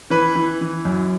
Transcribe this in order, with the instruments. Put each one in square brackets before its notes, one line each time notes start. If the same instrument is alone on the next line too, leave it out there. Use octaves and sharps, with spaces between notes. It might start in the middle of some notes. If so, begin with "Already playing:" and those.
[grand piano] E3 B4
E3
E3
F#2